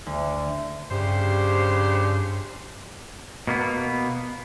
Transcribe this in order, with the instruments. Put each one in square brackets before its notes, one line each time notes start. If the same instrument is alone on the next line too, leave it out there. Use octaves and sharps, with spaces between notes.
[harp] D2
[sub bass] G2 [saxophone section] C#3 D4 G4 [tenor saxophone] C5
[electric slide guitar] B2 A#3 B3